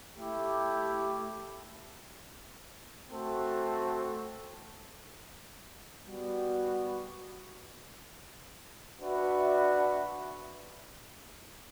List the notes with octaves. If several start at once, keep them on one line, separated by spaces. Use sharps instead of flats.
A3 E4 G4
A3 C4 F#4 A4 C5
G3 B3 F#4
D4 F#4 B4 E5